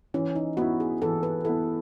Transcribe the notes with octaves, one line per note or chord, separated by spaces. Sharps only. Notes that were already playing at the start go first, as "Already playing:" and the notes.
E3 C#4
D#4
B3 E4 F#4
G#4
E3 A4
B4
B3 E4 A4